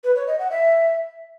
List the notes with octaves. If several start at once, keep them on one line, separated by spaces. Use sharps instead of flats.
B4
C#5
D#5
F#5
E5